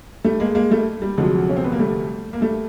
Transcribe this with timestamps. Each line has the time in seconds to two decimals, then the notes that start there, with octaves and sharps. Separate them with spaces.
0.24 G3 A3
0.40 G#3 A#3
0.55 G#3 A#3
0.71 G3 A3
1.02 G3
1.18 D2 C3 F3 F#3 G#3
1.49 C#4
1.56 C4
1.64 B3
1.72 A#3
1.79 G3 A3
2.33 A#3
2.41 G3 A3